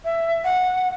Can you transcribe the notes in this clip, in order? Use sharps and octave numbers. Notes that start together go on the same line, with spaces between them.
E5
F#5